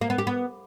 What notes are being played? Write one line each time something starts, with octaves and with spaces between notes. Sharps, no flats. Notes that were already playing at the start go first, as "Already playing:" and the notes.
A#3
B3
G4
B3